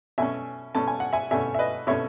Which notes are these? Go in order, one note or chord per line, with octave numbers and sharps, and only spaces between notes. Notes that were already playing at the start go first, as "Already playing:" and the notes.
B2 A3 C#4 E5 G#5
B2 A3 C#4 A5
G#5
F#5
E5 G#5
B2 A3 C#4 E5 G#5
E5
B4 D#5
B2 A3 C#4 C#5 E5